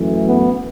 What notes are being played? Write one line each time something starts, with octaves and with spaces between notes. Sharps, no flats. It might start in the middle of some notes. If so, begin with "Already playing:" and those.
Already playing: F#2 E3 A3
B3